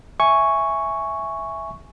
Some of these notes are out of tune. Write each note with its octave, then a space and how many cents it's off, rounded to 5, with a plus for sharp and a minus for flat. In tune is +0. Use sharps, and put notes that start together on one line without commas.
E5 +0 G#5 +0 C#6 +0